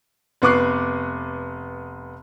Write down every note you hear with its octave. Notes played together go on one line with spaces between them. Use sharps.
F1 B3 C#6 D6 F#6 C7